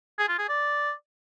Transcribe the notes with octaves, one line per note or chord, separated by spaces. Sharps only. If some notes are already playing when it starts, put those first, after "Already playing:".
G#4
F4
G#4
D5